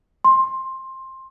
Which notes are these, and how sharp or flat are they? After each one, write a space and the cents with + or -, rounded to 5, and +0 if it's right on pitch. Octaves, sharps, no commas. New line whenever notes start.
C6 +15